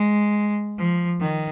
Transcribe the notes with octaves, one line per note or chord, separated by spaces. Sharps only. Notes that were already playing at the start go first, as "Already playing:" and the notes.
Already playing: G#3
F3
D#3